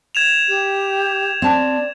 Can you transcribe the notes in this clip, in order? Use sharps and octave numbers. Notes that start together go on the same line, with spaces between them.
G#6 E7 F7
G4
C4 D5 A5